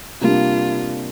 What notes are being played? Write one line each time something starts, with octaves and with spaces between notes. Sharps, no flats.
C3 G3 A#3 D4 F4